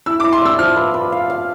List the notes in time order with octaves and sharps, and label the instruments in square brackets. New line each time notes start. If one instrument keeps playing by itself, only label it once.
[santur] E4 [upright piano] E6
[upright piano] D6
[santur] E4
[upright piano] C6
[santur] D5 [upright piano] E6
[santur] F3 [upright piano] F6
[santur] B4
B4
F5
F5